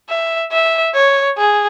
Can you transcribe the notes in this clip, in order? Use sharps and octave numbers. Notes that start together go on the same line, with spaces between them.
E5
E5
C#5
G#4